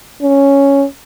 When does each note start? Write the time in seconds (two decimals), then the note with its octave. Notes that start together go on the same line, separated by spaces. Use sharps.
0.22 C#4